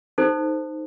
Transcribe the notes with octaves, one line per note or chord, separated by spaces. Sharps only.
D#4 A4 C5